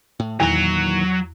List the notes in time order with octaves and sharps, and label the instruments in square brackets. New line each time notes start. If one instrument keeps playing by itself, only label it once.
[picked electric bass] A2
[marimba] E2 [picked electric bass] A#2 D#3 E3 [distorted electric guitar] F#3 A#5